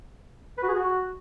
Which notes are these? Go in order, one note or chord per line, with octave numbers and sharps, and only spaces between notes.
B4
F#4
G#4
F#4